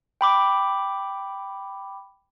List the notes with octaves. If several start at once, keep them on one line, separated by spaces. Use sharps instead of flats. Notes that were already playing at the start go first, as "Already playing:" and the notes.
G5 B5 D6